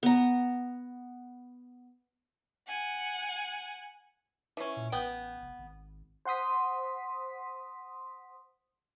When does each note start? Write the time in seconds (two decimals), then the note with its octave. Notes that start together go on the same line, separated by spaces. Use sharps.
0.03 B3 A#5
2.67 F#5 G#5
4.57 E3 C#4
4.77 A#2
4.92 A1 B3 G5
5.42 F1
5.59 G#1
6.25 C5 F#5 C6 D#6 B6